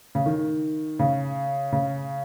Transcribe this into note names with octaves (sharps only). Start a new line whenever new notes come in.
C#3
D#3
C#3
C#3